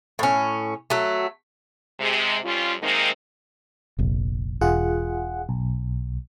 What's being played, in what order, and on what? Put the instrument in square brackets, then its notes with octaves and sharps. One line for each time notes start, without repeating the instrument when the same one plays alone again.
[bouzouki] A2 C#4
F#3 A3
[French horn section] C3 G#3
F2 G3 C#4 F4
C3 D#3 G#3 A#3 C4 D#4
[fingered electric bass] F1 A#1
[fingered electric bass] E1 [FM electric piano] F4 G#4 F#5
[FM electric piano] B1